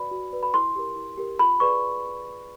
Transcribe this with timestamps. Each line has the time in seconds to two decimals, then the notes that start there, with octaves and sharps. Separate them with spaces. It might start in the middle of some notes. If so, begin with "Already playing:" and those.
Already playing: F#4 B4 D5 B5
0.11 F#4
0.32 B4 D5
0.43 B5
0.54 E4 C6
0.76 G4 A#4
0.96 E4
1.17 G4 A#4
1.39 F4 B5
1.60 G#4 B4 D5 C#6